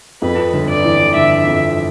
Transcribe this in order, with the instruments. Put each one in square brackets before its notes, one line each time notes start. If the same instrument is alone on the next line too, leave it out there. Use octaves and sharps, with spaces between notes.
[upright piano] F2 [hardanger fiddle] B4
[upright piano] G1
[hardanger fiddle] D5
[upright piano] E3
[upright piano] G1 [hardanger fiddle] E5
[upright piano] F2